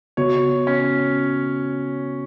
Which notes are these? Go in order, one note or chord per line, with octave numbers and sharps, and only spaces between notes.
C#3 B3 F#4 C#5
C#4